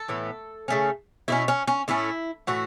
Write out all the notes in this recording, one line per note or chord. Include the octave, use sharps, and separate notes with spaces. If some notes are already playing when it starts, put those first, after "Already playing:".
Already playing: A4
A2 E3 B3
C#3 A3 C#4
B2 A3 C#4 E4
C#4
C#4
A2 A3 C#4 E4
A2 E3 A3 F#4